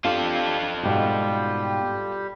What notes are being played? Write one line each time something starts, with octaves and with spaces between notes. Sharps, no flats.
D4 F4 G4 A4 F5
G#2 B2 G3 F#4 G4